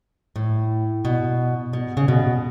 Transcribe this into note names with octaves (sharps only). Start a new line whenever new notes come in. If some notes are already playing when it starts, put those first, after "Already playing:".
A2
B2
B2
C#3
B2